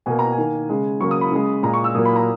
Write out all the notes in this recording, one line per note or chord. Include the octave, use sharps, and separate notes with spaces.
B2 A#3 G#5
A#5
G#5
D#3 A#3
C#3 G#3
C#3 F#3 A#3 C#6
D#6
B5
C#3 G#3
A#2 G#3 A#5
C#6
E6
A#2 F#3 A#3 D#6
B5
A#5